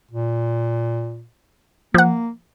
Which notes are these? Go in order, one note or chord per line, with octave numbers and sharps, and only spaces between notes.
A#2
F3 A#3 F#5